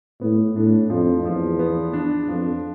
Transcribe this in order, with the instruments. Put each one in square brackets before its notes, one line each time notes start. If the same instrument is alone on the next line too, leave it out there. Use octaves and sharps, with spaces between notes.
[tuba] A2 [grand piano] B3
[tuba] A2 [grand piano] D4
[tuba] F2 [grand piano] F3
[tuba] E2 [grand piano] F3
[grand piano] B3
D4
[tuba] F2 [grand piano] F3